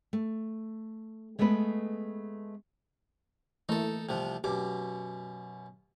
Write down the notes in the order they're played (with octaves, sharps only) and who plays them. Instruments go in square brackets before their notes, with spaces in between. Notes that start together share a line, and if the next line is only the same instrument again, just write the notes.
[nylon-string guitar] A3
G#3 A3 B3 A4 B4
[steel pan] E3 A3 A#3 [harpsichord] D#4 A4
[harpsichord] C2 C3 F3
[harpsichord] F#2 B2 D6 [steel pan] G4